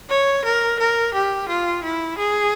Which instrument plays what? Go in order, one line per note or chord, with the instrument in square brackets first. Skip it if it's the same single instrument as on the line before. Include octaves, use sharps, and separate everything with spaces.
[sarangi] C#5
A#4
A#4
G4
F4
E4
G#4